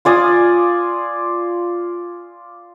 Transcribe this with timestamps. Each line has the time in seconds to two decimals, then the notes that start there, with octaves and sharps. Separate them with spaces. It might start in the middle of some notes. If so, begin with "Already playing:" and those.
0.05 F4 D5 G#5 D#6